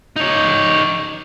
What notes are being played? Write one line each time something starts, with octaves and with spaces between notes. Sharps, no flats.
D#4 C#5